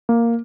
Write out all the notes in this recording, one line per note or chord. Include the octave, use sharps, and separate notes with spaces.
A#3